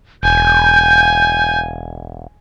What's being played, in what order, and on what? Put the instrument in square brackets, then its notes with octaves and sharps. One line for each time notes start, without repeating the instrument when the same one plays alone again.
[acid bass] E1 [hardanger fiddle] G#5 [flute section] G6